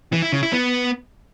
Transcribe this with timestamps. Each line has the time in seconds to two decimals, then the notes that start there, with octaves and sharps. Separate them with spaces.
0.12 E3
0.23 E4
0.33 C#3
0.43 E4
0.53 B3